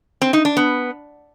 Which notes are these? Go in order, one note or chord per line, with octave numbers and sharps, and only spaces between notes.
C4
D#4
D4
B3